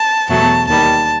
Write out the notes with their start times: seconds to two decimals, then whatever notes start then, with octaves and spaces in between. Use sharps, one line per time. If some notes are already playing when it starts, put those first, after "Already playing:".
Already playing: A5
0.29 E2 B2 F#3 A3 A5
0.67 D#2 D#3 G3 A5